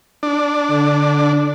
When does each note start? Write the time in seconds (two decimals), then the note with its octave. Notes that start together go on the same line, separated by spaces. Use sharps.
0.23 D4
0.70 D3